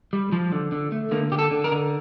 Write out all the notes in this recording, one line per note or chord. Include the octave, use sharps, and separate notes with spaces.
G3
F3
D3
D3
A3
D3 A#3
D3 G4
A4
D3
A#4
D3